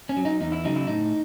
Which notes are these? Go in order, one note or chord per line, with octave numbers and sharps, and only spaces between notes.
C#4
F#3
D#4
E2 D#4
E4
C#3 F#3 D#4
E4
A2 D#4